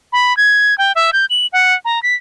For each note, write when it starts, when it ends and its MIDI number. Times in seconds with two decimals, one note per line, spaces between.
0.12 0.36 83
0.37 0.77 92
0.78 0.92 79
0.95 1.10 76
1.13 1.25 91
1.30 1.47 102
1.53 1.74 78
1.85 2.02 82
2.03 2.15 95